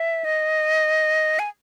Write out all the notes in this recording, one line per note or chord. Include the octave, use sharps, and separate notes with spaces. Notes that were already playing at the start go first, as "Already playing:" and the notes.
Already playing: E5
D#5
G#5